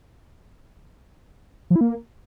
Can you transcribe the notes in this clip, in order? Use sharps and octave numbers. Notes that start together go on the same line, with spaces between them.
F3
E4
A#3